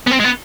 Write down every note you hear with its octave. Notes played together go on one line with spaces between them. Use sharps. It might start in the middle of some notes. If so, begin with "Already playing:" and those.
B3
C4
G#3
B3